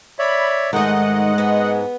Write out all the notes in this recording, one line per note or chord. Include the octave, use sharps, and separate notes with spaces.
C#5 D5 E5 B5
G#2 D#3 G#3 A3 D#5 F#5
B3